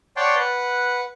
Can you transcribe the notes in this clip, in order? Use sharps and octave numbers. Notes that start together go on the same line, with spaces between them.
C#5 D5 F#5 G5 A5 C6
B4 F#5